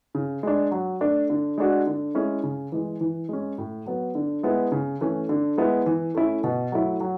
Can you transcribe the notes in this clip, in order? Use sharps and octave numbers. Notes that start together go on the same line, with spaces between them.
C#3
G#3 D4
F#3
A3 D4
D3
G#3 D4 F#4
D3
G#3 C#4 E4
C#3
E3 G#3
E3
G#3 C#4
A2
F#3 B3
D3
G#3 B3 E4
C#3
E3 A3 C#4
D3
G#3 B3 E4
E3
A3 C#4 E4
B2
F#3 A3 E4
F#3